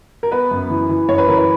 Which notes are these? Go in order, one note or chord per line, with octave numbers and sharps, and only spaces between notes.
A#4
B3 B4
F#2
E3
E3
F#2 C#5
B4
E3 A#4
B4